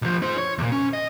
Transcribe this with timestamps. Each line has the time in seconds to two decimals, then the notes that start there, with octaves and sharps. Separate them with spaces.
0.02 B1 F3
0.22 D#4 C5
0.38 C#5
0.58 E2 A#2
0.72 C#4
0.93 D#5